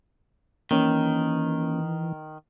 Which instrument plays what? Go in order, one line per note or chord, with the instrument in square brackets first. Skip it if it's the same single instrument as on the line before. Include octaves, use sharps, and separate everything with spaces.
[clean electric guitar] D#3 [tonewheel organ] E3 [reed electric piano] A#3 C#4